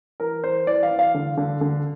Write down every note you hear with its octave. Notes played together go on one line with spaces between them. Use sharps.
E3 A#4
E3 C5
E3 D5
F5
E3
F5
D3
D3
D3